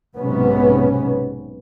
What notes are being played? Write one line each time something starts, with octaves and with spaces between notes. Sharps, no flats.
B1 G#2 C3 B3 C#4